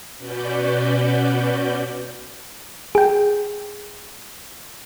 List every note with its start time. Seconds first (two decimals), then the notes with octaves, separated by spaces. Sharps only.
0.18 B2 C#4 F#4 B4 D5 G6
2.95 G#4 G5